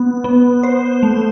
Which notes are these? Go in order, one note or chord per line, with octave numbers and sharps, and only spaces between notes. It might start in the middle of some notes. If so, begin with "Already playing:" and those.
Already playing: B3
B3
C5
A3